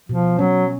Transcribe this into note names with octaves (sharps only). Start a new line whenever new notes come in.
B2 F3
F#3 C#4